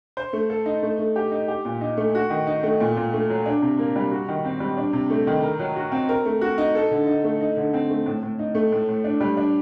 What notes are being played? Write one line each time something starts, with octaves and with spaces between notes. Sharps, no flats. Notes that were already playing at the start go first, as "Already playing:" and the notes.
C5
A3
A4
D#4
A3
A3
G4
D#4
G4
A#2
D#4
A3
F#4
D#3
D#4
A3
A#2
A#2
A3
F#3
D4
C3
A#3
G3
F#4
D#3
C4
G3
D4
C3
A3
D#3
A#4
F#3
F#4
C4
A#4
A3
F#4
D#4
A4
D3
D#4
A3
D#4
D3
C4
A3
A2
A2
D#4
A3
A2
A2
D4
G3
D4